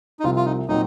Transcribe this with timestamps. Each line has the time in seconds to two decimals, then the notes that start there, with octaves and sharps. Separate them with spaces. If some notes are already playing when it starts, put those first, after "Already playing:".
0.20 D#4
0.24 C2 C3 F3 F4
0.36 F4
0.46 D#4
0.68 A#2 F#3 C4 D#4